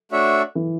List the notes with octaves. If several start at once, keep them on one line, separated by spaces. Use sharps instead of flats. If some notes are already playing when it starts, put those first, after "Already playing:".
A3 D4 F#4 C#5 E5
E3